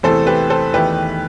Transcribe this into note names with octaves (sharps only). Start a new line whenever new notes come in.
E2 C3 E3 A3 A4 C5
G4 B4
A4 C5
E2 D#3 A3 G4 B4